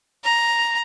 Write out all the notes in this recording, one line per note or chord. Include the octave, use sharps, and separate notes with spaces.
A#5